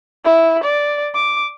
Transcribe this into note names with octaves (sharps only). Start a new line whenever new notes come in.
E4
D5
D6